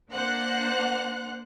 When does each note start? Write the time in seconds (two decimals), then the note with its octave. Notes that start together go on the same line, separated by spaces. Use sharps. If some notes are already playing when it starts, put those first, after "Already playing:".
0.12 A#3 D4 C5 F#5 F#6